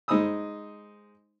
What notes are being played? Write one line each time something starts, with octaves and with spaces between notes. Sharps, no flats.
G#3 D#4 C5 B5 D#6 E6